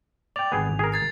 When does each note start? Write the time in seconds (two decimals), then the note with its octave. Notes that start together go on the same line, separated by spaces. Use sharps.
0.36 D5 G5 F7
0.52 G#1 B3 G#4 G5 G#5
0.79 G#4 A#4
0.92 G#6 A6 C7